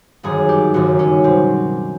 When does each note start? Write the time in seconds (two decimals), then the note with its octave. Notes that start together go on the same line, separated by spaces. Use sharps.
0.23 G1 F#2 D#3 G#4
0.49 G4
0.74 G1 F#2 D#3 F#4
0.99 C#4
1.24 B2 C4